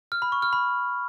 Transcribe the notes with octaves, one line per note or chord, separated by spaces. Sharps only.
F6
B5
C#6
F6
B5